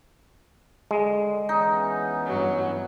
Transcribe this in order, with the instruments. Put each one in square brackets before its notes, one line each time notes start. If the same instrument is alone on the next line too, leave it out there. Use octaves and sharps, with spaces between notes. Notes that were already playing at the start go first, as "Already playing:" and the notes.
[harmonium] D3 [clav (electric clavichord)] G#3
[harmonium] E3 B3 C#4 [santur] D#4
[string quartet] G2 F#3